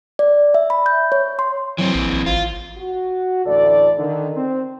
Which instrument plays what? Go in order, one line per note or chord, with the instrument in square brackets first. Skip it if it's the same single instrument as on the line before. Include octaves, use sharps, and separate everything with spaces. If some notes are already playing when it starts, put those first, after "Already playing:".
[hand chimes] D5
E5
B5
G6
C#5
C6
[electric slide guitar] E3 C4 [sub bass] F#3
[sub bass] A#1
A#1
[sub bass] G#1 [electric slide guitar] F4
[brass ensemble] F#4
A1 D2 A2 A4 D5
D3 D#3
C4